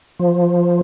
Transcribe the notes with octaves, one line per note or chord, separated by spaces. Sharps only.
F3